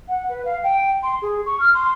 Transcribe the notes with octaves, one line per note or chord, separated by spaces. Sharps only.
F#5
B4
F5
G5
C6
G#4
C#6
F6
C6